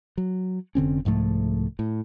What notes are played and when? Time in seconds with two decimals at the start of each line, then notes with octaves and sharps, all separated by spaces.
0.18 F#3
0.75 F1 D3 C4 C#4
1.05 C2 G#2 F3 A3
1.79 A2